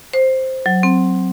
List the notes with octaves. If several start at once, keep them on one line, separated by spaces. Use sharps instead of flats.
C5
F#3
C4